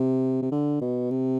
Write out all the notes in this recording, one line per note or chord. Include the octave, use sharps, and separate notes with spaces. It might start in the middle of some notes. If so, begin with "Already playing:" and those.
Already playing: C3
C3
D3
B2
C3